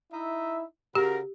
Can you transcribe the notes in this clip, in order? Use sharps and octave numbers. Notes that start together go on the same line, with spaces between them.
D#4 E4 E5
C#3 F#4 G4 A#4